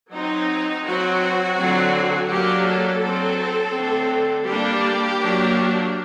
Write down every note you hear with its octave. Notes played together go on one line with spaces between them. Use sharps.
F#3 C4 D#4
F#3 C4 F#4
D3 F#3 C4
F#3 A#3 D4 G4
A4
F#3 C4
D3 A3 C4
G3 A#3 D4 G4
F#3 A#3 D4